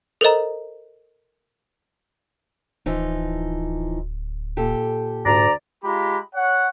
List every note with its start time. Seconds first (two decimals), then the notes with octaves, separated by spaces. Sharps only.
0.21 A4 A#4 C5 D#5 A#5
2.86 D1 E3 F3 D#4
4.57 A#2 G4 A4
5.26 D2 G#2 D5 A#5
5.84 G#3 F4 G4 A#5 B5
6.35 C#5 F#5